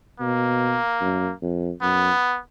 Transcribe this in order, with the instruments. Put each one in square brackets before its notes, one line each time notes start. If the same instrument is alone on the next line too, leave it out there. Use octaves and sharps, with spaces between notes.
[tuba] B2 [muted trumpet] A#3
[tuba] F#2
F2
[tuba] F#2 [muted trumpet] B3